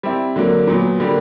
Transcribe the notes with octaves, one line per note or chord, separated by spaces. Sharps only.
G3 C4 E4
D3 F#3 A#3
A#2 F#3 B3
D3 G3 A#3